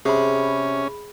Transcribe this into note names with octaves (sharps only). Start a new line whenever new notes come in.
C3 C#4 G#4 B5